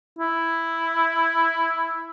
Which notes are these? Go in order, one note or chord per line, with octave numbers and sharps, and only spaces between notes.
E4